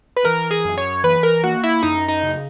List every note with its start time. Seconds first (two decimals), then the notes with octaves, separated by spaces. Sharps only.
0.17 B4
0.25 E3 A#4
0.51 G#4
0.65 F#2
0.78 C#5
1.04 E3 B4
1.23 A#4
1.44 A#3 F#4
1.64 E4
1.83 F#2 D#4
2.08 D#4
2.23 C#3